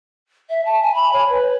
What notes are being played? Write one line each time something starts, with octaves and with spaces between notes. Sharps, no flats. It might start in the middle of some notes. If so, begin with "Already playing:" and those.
E5
A5
G#5
B5
C#5
B4